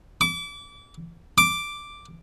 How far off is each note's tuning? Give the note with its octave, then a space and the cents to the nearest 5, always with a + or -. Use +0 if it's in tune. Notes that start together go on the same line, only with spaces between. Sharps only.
D6 -30
D6 +0